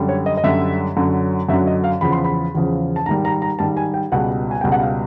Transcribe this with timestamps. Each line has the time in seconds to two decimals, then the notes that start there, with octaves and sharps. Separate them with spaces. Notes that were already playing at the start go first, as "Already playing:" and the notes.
Already playing: F#2 D3 G3
0.09 C#5
0.26 D#5
0.37 D#5
0.44 F#2 D3 G3 E5
0.97 F#2 D3 F#3
1.49 F#2 D3 F#3 E5
1.67 D#5
1.84 F5
2.01 E2 C#3 F3 B5
2.12 C6
2.24 B5
2.55 E2 C#3 F3
2.96 A5
3.06 G#2 D#3 G3 A#5
3.25 A#5
3.42 A#5
3.59 G#2 D#3 G3 A5
3.77 G#5
3.94 G5
4.12 C#2 B2 G3 F#5
4.51 G#5
4.61 C#2 B2 G3 G5
4.72 F#5
4.81 F5